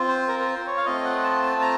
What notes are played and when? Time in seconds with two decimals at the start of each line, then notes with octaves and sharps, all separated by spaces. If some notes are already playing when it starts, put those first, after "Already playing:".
Already playing: C4 F4
0.08 C5
0.28 A#4
0.40 A#4
0.47 C5
0.66 C#5
0.77 F5
0.85 A3 C4 F4 D#5
1.05 F#5
1.23 A5
1.43 A5
1.61 A#5